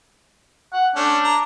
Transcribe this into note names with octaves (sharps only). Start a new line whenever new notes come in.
F#5
A3 C#4 D4
A#5